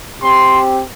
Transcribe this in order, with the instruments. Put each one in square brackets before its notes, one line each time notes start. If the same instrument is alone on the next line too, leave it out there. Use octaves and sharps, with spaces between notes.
[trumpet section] C4 G4 C6